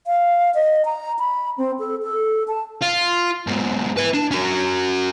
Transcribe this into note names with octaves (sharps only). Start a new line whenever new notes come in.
F5
D#5
A#5
B5
C4
A4
A4
A5
F4
G#2 B2
B4 E5
D4
C#4 F#4